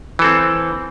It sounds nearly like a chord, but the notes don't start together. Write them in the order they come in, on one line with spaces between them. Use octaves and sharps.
E3 A4 C4